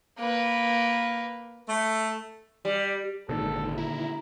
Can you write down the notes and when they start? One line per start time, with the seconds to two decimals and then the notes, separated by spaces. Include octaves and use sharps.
0.19 A#3 B4
1.68 A3
2.65 G3
3.29 G#1 A#2 D3 D#3 A4
3.78 E4 A#5